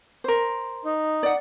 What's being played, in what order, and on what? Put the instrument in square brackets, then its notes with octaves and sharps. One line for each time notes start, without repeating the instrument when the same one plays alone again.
[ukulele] A#4 C5
[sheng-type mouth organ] D#4
[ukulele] D5 F#5